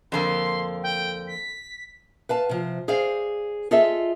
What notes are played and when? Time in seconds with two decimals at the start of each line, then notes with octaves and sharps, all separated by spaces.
0.12 F2 D3 A#3 C6
0.83 G5
1.28 B6
2.29 B4 F5 A5
2.49 C3 F3
2.88 G#4 C5 D5 F5
3.71 F4 G#4 A4 D#5 E5